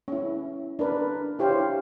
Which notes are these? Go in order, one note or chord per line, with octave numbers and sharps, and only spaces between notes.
C#4 E4
D4 A#4 B4
E4 G4 C5 C#5 F5
D4